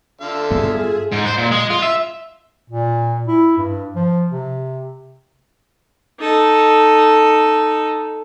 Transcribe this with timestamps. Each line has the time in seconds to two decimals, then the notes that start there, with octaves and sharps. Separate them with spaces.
0.21 D3 F4 A4 E5 F5
0.51 G2 F#3 B3 G#4
1.12 G#2
1.25 C5
1.38 A#2
1.51 G#3
1.70 F4
1.82 E5
2.69 A#2
3.27 E4
3.58 G2
3.95 F3
4.30 C3
6.20 D#4 A4